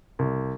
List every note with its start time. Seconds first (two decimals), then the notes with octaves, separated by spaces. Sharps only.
0.19 C2